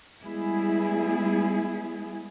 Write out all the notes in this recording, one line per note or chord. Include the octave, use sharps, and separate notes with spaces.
G3 G#3 B3 E4 G#4